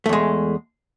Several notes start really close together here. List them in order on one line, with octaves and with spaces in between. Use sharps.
A3 E2 G#3